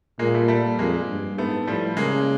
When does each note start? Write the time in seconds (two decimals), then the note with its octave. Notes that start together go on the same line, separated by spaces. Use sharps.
0.19 A#2 G#3 A#3
0.34 G3 A3
0.48 G3 A3
0.79 F2 G#3 A#3
1.08 G2
1.38 G#2 A3 B3
1.67 A2 F3 G3
1.97 C#3 G#3 A#3